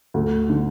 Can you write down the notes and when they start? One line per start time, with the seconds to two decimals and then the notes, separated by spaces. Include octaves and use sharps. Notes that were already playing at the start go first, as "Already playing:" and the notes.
0.14 D2
0.50 D3